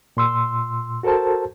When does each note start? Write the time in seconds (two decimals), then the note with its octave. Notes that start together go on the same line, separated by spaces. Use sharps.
0.17 A#2 C6 E6
1.03 F#4 A4 A#4 C5 A5